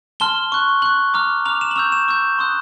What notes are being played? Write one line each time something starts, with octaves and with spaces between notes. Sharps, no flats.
A5 C6 F6 G7
C#6 F#6
C#6 F#6 F#7
A#5 D6 F6
A#5 D6 F6 F7
E7
F#7
C#6 E6 G6 F7
E7
C#6 E6 G6
C6 D#6 F#6